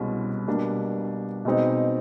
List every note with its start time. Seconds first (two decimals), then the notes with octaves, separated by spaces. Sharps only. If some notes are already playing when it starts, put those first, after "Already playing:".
Already playing: C2 B2 G#3 C#4 E4
0.47 B2 G3 A#3 D4
1.45 B2 G#3 C4 D#4